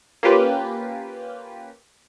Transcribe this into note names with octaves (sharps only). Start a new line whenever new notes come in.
A#3 C#4 F4 G4 B4